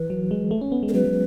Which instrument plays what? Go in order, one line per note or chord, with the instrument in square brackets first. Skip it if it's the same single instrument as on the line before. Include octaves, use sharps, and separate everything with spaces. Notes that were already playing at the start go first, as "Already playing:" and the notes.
Already playing: [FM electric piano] E3 [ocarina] B4
[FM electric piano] F#3
G#3
A3
C#4
B3
G#3
[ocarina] A4
[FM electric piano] F#3 [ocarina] B4
[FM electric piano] F#3